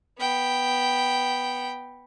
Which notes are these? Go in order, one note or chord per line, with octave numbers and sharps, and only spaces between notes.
B3 G5